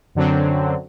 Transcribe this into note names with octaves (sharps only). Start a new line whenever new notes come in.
F#2 D3 F#3 C4